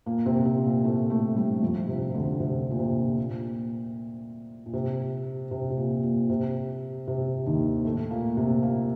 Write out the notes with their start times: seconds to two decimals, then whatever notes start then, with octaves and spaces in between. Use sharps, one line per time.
0.06 A#2 A#3
0.26 C3 C4
0.45 C3 C4
0.65 A#2 A#3
0.84 A2 A3
1.10 A2 A3
1.36 G2 G3
1.62 F2 F3
1.88 C3
2.10 C3
2.14 D2 D3
2.40 C3
2.70 A#2
2.79 C3
3.18 A#2
4.66 A#2
4.73 C3
5.51 C3
5.70 C3
5.77 A#2
6.03 A#2
6.29 C3
7.07 C3
7.46 D#2 D#3
7.85 A2 A3
8.11 A#2 A#3
8.37 C3 C4
8.63 A#2 A#3